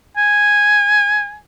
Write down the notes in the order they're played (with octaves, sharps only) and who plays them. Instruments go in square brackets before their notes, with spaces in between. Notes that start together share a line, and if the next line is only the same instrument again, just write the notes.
[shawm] G#5